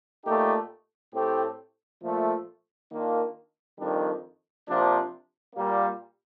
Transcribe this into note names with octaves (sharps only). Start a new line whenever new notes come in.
A#2 A3 D#4 G4
A2 A3 C4 G4
A#2 F3 A3
D#3 A#3 D4 F4
F2 D#3 G3 D4
C3 F3 A#3 D4
A#2 G3 A#3